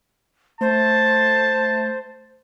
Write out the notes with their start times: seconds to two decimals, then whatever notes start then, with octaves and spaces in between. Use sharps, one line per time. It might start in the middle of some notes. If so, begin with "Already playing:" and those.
0.61 A3 C5 A5